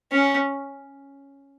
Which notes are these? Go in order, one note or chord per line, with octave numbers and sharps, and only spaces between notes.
C#4